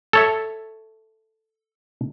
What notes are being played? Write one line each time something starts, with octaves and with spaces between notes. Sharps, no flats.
A4 C#5 E5